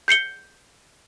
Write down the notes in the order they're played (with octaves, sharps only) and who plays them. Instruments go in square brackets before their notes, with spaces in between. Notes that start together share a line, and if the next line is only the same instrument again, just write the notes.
[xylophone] G6 C7 C#7 G7